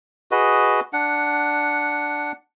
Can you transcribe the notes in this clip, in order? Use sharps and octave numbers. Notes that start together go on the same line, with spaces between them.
F#4 G#4 B4 D#5
D4 F#5